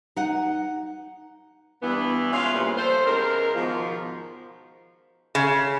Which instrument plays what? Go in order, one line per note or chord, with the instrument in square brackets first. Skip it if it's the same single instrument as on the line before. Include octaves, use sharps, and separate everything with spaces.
[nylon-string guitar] D#4 F#5
[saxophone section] G2 E3 B3
G#3 C#4 F4 B4 E5 F5
G2 A#2 C#3 F3 G3
G3 F4 A4 C5
E2 C#3 G#3 A#4
G#2 B2 D#3 F3
[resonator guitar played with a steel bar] C#3